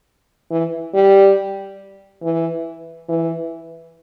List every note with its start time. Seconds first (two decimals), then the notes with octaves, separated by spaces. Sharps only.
0.51 E3
0.94 G3
2.23 E3
3.09 E3